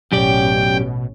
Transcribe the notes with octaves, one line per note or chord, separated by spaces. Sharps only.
A1 F#2 B2 C#4 G4 D5 G5